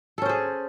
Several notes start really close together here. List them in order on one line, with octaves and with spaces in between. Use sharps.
A4 C#4 C5 G#4